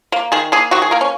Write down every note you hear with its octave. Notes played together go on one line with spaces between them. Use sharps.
A#3
D#3 G#4
A#3 G#4
D#3 F#4
G#4
A#3 A#4
C#4